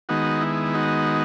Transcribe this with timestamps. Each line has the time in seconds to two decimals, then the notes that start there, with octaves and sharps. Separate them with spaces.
0.09 D#3 G#3 B3 D#4 F#4
0.41 E4
0.75 D#4 F#4